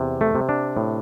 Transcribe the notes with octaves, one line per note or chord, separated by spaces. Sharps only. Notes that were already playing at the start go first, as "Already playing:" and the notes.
Already playing: E2 C3
A3
C3
D4
A2